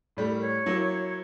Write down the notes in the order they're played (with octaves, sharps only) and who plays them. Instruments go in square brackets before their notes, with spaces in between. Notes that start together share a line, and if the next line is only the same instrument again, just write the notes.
[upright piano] A2 G3 A3
[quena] A#4
C#5
[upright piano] F#3 A#3 E4